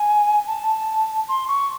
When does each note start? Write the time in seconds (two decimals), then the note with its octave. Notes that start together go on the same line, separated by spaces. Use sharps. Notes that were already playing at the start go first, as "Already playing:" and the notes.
Already playing: G#5
0.47 A5
1.29 C6
1.48 C#6